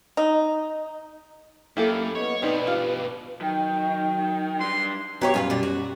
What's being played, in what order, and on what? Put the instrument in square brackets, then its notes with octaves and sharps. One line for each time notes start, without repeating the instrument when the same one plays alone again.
[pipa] D#4
[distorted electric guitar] F#2 [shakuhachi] A#3 [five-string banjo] E4 G4 A4
[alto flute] B3 [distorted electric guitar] C#5 [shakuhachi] D#5
[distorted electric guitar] G2 B2 [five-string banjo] B3 C4 D#4 [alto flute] B4 [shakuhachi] D5
[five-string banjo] F4 [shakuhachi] G4
[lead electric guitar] D#3 [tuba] F#3 [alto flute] G5
[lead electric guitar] G3 D4 [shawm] C6
[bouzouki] F#3 G4 C#5 [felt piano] B3 A#5
[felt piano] F#2 G3 [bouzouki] F4 G#4 B4
[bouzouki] B2 D4
F#4